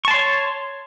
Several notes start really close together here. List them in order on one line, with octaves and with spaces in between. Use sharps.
C#6 A5 C6 C#5